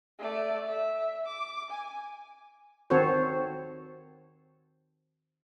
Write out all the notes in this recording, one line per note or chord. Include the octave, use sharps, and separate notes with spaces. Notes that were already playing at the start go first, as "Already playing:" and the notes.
A3 D5
E5
D6
G#5
D#3 C4 F#4 A4 C5 C#5